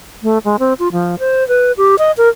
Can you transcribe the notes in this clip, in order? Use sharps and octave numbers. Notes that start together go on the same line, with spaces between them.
A3
G#3
C4
F4
F3
C5
B4
G4
D#5
A#4